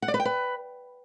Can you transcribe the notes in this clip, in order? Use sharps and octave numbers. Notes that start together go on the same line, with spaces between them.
F#5
D5
B4
G5
B4